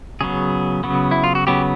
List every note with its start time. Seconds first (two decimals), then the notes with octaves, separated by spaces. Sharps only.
0.21 C#3 F#3 B3 G#4
0.84 C#3 F#3 B3
1.11 E4
1.24 F4
1.35 F#4
1.47 C#3 F#3 B3 G4